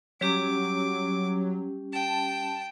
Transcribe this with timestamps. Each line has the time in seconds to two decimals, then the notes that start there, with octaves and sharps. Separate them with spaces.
0.21 F#3 G3 C#4 G4 D6
1.93 G5 A5